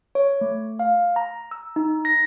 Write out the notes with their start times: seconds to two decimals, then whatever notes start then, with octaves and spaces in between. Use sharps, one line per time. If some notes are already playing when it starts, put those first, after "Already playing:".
0.15 C#5
0.41 A3
0.79 F5
1.16 A#5
1.51 E6
1.76 D#4
2.05 A#6